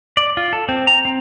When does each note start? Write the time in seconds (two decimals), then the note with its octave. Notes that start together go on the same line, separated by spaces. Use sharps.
0.17 D5
0.37 F4
0.53 A4
0.69 C4
0.87 A#5
1.05 C4